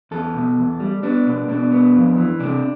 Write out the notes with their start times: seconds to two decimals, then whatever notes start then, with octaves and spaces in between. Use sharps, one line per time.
0.11 E2 A4
0.34 B2
0.57 E2
0.80 G3
1.03 B3 D4
1.26 B2
1.48 B2 D4
1.72 B3
1.95 F2
2.17 E3
2.39 C3 D4